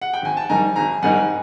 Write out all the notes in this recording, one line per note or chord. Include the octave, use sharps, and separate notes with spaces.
F#5
G5
G#1 G#5
A5
G#2 D#3 G3 G#5 A#5
G#1 G#5 A#5
G#2 D#3 G3 F#5 G#5